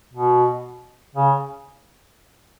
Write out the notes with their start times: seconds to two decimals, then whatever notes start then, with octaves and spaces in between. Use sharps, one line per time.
0.13 B2
1.15 C#3